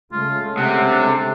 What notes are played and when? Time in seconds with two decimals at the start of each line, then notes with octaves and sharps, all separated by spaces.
0.12 C#3 G#3 A3 F4
0.58 C3 F#5
0.90 D4